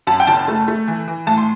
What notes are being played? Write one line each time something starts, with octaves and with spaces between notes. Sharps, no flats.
F#2 A5
G5
F#1 A5
A3
A3
E3
E3
A2 A5
C6